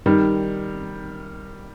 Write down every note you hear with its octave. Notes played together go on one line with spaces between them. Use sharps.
D#3 G3